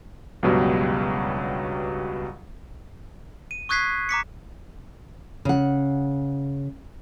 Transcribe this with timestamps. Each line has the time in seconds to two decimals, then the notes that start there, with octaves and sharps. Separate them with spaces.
0.43 C#2 G2 B2 F#3 G3
3.51 D#7
3.69 C#6 D#6 F#6 G#6 B6 C7
4.09 A#5 D6 B6 C#7
5.45 C#3 F#5